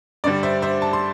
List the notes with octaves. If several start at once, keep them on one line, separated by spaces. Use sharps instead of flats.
G2 D3 G3 D5
C5 E5
C5 E5
A5
C6